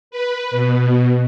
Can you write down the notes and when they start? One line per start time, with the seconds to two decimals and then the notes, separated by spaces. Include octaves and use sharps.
0.11 B4
0.51 B2